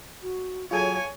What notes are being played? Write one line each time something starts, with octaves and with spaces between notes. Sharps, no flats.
F#4
F#3 F4 G#4 A4 C#5 G#5